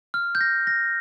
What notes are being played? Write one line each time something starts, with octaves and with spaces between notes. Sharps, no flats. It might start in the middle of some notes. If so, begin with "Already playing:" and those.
F6
G6
A#6
A#6